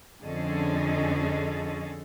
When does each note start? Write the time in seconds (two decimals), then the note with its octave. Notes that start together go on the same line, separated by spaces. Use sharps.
0.23 F2 D3 C#4 G#4 A4 D#5